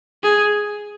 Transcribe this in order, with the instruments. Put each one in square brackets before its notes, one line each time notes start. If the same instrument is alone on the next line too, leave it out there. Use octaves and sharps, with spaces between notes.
[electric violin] G#4